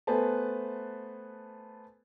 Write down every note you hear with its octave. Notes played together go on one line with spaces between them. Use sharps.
A3 B3 B4 C5 G#5 A5